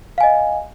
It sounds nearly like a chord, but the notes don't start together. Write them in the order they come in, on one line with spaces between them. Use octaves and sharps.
F5 G#5 D#5